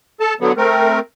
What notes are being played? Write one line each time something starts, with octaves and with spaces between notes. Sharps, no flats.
A4 A5
D3 F#3 B3
A3 C4 A#4